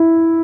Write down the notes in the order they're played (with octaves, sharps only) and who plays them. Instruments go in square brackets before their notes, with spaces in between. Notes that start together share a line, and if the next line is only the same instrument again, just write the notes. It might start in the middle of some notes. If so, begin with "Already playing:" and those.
Already playing: [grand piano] E4